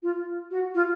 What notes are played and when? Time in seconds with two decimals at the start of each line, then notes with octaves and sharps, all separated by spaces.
0.02 F4
0.50 F#4
0.74 F4